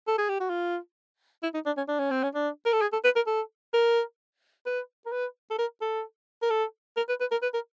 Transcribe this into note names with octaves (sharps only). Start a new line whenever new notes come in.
A4
G#4
G4
F#4
F4
E4
D#4
D4
C#4
D4
C#4
C4
C#4
D4
A#4
A4
G#4
A4
B4
A#4
A4
A#4
B4
A#4
B4
A4
A#4
A4
A#4
A4
A#4
B4
B4
A#4
B4
A#4